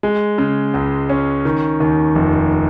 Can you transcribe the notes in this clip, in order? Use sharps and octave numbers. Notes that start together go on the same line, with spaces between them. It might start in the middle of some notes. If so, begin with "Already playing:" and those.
G#3
C#3
C#2
C#4
D#3
D#2
F1